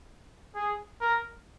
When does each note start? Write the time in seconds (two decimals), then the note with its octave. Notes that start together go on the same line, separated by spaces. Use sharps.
0.55 G#4
1.01 A#4